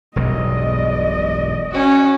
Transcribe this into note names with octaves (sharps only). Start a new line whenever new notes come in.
E1 B1 G2 D5 D#5
C#4 F#4